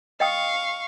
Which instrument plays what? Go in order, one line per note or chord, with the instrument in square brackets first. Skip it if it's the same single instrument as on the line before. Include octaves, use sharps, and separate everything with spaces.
[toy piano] D#5 G5 D#6 [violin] F5 C#6